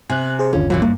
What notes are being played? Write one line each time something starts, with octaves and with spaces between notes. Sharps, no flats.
C3 G#5 F#6
G#4 C5
G1 D#2 D3 C#4 F4
A#2 E3 F#3 C#4
G2 A#3